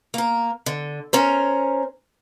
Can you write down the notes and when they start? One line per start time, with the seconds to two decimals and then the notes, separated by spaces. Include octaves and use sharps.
0.14 A#3 A#4
0.66 D3
1.13 C#4 A#4 C5